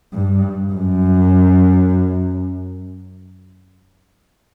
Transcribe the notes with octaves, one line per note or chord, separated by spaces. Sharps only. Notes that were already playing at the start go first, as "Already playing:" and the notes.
G2
F#2